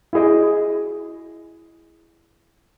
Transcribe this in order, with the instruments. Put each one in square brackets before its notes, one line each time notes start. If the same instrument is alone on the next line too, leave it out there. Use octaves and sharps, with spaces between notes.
[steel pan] E4 F#4 G#4 D#5